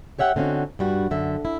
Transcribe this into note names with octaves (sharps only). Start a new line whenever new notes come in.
G4 C#5 E5 F#5 G5
D3 C4 C#4 D#4 F#4
G2 G3 F#4
F#2 D3 E5
E4